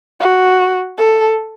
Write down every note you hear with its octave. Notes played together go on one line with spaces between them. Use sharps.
F#4
A4